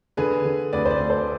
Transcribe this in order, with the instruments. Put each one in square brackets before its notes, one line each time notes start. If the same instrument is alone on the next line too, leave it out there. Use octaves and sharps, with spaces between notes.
[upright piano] D3 G#4 B4
D3
D2 B4 D5
C5
B4 D5
D2
A4 C5